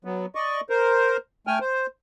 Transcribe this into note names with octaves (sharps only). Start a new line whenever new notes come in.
F#3 B3
D5 D#5 C#6
A#4 C5
A3 G5 G#5 F6
C5